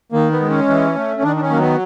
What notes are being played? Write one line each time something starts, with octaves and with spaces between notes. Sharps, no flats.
D#3 A#3
B3
G#3
C#4
E3
A3
C#4
D#3 D4
D4
C#4
F#3 A#3
B3